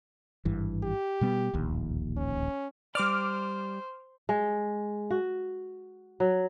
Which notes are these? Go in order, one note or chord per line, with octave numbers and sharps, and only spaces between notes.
G#1 G2 E3
G4
B2 G3 B3
D1 A#1 D#2
C#4
G3 C5 D5 D6 F6
G#3
F#4
F#3